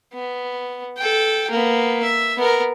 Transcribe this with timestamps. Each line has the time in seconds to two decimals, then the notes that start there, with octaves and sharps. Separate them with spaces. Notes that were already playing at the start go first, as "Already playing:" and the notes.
0.13 B3
0.97 A4 G5
1.50 A#3 B3
2.03 E5
2.37 B3 A#4